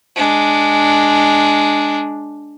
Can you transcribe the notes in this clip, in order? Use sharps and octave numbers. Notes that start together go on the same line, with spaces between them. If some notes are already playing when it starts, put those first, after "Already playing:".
G#3 D4